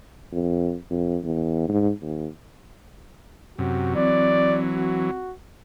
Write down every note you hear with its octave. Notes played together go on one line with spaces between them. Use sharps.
F2
F2
E2
G#2
D#2
F#2 C3 F#4
E3 F#3 C4 D5
F#4